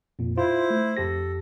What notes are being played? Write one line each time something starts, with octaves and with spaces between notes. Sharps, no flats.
F2 A#2
E4 F4 C5
A3
F2 G4 A4 A#6